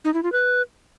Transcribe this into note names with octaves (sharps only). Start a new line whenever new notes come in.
D#4
E4
F4
B4